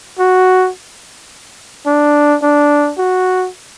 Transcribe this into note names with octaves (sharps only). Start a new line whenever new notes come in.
F#4
D4
D4
F#4